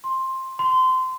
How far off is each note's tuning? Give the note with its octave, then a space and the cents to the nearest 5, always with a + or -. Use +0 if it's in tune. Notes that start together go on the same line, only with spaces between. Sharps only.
C6 +10
C6 -25